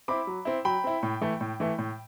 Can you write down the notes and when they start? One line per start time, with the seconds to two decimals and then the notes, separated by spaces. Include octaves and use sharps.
0.08 C4 E4 B5 D6
0.27 F#3
0.45 C4 E4
0.65 F#3 G5 B5
0.84 C4 E4
1.03 A2
1.21 E3 A3 E4
1.41 A2
1.60 E3 A3 E4
1.78 A2